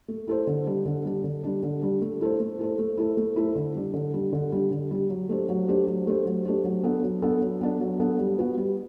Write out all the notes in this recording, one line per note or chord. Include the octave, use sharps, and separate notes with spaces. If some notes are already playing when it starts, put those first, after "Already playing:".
A3
E4 A4 C5
D3
G3 D4
D3
G3 D4
D3
G3 D4
D3
G3 D4
A3
E4 A4 C5
A3
E4 A4 C5
A3
E4 A4 C5
A3
E4 A4 C5
D3
G3 D4
D3
G3 D4
D3
G3 D4
D3
G3 D4
F#3
A3 D4 G4 C5
F#3
A3 D4 G4 C5
F#3
A3 D4 G4 C5
F#3
A3 D4 G4 C5
F#3
B3 D4 A4
F#3
B3 D4 A4
F#3
B3 D4 A4
F#3
B3 D4 A4
G3
B3 F#4 B4
G3